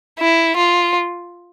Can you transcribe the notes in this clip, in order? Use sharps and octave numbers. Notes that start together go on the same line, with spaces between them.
E4
F4